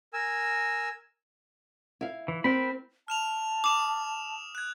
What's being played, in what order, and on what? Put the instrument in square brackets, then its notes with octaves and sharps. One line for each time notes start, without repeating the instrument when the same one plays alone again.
[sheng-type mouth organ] A#4 G#5 E6
[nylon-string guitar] E4 F5
[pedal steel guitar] E3
[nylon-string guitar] C4 [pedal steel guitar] A#4 G5 B5
[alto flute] A5 [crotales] F6 E7 F7
[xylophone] D6 [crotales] D#6 E7 F7
[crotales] F#6 G#6